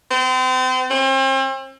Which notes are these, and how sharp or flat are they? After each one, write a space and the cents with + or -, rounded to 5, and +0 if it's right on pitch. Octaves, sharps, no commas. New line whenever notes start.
C4 -35
C4 +40